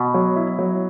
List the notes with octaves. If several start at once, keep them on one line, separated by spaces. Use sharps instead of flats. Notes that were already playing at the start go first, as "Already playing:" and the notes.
Already playing: B2
F#3
E4
F#3